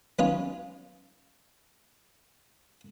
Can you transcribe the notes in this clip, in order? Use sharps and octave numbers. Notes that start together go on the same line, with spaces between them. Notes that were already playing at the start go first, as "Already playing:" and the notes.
F#3 B3 C#4 D#4 F4